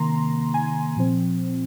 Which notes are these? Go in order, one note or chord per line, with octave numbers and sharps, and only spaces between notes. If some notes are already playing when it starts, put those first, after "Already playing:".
Already playing: C3 D#3 A#3 A#5 C6
G#5
A#2 F3 C4